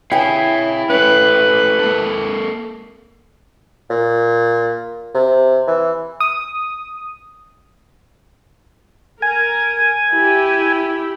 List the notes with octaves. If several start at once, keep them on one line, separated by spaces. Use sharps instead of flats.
E4 C#5 F5 G5 G#5
A3 C#4 B4
A#3 A4
A#2
C3
E3
D#6
A#4 G#5
E4 G4